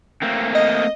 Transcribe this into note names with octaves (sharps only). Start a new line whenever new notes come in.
A3 A#3 C4
D#5